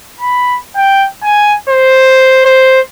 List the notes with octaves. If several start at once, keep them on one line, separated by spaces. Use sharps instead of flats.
B5
G5
G#5
C5
C5